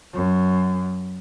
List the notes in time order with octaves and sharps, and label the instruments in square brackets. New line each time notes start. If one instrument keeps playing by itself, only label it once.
[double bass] F#2